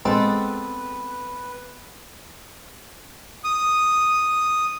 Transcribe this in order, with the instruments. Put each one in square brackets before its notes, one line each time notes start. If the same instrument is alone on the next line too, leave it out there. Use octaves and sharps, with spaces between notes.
[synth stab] A#1 G#3 A6 [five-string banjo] B3 C4 A4 [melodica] B4
[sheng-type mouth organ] D#6